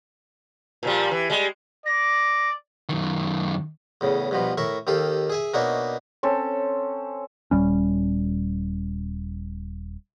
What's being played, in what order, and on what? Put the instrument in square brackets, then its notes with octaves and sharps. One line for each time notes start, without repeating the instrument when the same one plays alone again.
[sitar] A#2 F3 G3
E3
G3 G#3
[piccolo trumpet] D5 [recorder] A#6
[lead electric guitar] F#2 D#3
[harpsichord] E2 A2 C#3
G2 B2 F3
A2 A#4 E5 C#6
D#2 D#3 G4 A4 F5
G#4 E5 G#5
B2 A#3 D4 D#4 C#5 E5
[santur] C4 C#4 A4
[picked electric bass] D#1 G#2 G3 C#4